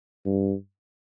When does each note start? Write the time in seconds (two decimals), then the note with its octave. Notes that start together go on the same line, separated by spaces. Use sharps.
0.26 G2